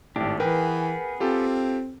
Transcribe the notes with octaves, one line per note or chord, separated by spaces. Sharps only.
G#1 A2 D4 G4
E3 B3 G#4 A#4 B4 G5
C4 F4 G4 A4